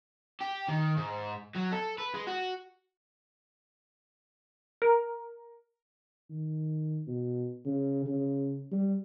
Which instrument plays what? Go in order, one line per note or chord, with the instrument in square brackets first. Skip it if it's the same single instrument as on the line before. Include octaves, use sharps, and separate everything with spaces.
[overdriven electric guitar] G4
D#3
G#2
F#3
A4
B4
G#3
F#4
[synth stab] A#4
[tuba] D#3
B2
C#3
C#3
G3